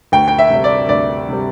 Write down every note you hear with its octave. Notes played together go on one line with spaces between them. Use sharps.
D2 G5
G5
E5
C3 G3
D5
D2 D5
C3 G3